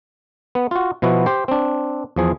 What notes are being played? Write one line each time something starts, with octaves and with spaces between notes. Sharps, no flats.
B3
F4 F#4
B2 F3 B3 E4 F#4
G4 C5
C4 D4
E2 F3 G#4